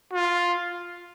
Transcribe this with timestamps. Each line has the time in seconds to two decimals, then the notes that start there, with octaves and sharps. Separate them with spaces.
0.13 F4